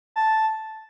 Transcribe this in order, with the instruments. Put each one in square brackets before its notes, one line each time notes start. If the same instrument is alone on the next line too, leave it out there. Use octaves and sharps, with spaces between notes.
[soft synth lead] A5